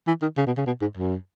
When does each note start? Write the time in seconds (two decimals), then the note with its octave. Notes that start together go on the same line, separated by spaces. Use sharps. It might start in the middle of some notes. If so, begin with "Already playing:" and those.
0.07 E3
0.22 D#3
0.37 C#3
0.47 B2
0.57 C#3
0.67 B2
0.81 G#2
0.97 F#2